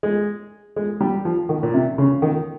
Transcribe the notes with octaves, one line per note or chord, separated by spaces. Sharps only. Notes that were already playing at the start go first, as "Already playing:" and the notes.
G#3
G#3
G3
F3
D#3
A#2
C3
C#3
D#3